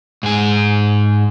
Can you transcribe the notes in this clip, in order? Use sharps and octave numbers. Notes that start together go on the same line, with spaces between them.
G#2 G#4